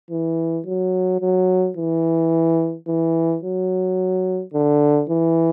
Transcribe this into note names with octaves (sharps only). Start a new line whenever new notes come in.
E3
F#3
F#3
E3
E3
F#3
D3
E3